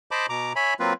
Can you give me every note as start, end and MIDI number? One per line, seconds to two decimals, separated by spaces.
0.11 0.26 72
0.11 0.26 75
0.11 0.26 81
0.11 0.26 83
0.11 0.26 86
0.29 0.53 47
0.29 0.53 82
0.29 0.53 86
0.56 0.74 73
0.56 0.74 76
0.56 0.74 80
0.56 0.74 83
0.80 0.93 54
0.80 0.93 58
0.80 0.93 60
0.80 0.93 65
0.80 0.93 71